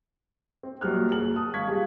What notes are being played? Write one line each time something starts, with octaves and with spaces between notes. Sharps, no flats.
C4
A#1 F#3 G3 F6 F#6
F#1 G#4 F#7
A5 D#6
G#1 F5 C#6 G#6 B6
G3 F4 G#4